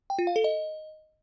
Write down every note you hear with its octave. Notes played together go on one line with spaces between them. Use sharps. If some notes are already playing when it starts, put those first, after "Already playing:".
G5
F4
F5
A4
D#5